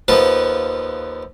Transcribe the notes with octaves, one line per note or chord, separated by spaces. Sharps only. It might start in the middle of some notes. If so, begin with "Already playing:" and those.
D#2 F3 B3 F4 A5